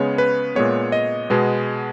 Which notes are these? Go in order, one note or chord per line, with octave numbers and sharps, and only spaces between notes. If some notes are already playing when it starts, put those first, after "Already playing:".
Already playing: C#3 G#3 B3 C#5
B4
A#2 G#3 B3 C#5
D#5
B2 G#3 B3